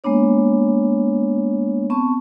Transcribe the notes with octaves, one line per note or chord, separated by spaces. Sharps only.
G#3 A#3 B3 D4 C#5
B3 C4 A5 C#6